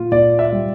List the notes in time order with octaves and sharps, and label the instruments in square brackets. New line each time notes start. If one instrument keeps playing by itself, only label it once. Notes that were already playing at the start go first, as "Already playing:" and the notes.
Already playing: [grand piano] A#2 F4
A#2 D5
E5
G3